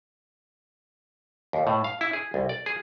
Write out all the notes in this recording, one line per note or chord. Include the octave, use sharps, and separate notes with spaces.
D#2
A2
F5
E4
G#4
C2
D5
G#4